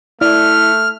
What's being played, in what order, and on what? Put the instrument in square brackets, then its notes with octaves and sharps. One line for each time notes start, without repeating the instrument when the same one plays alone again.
[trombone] A3 [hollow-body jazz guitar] E4 D5 [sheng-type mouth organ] F6